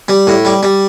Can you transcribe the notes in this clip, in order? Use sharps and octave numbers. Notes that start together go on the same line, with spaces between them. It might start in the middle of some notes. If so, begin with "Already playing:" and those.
G3
A2
G3
G3